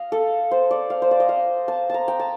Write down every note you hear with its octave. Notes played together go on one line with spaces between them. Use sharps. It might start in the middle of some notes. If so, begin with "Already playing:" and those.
Already playing: D#5 F5
A4
C5
D5
F5
C5
D5
D#5
F5
A5
A5 A#5
G5
A5